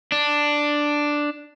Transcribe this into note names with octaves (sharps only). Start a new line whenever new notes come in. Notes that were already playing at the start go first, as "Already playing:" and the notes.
D4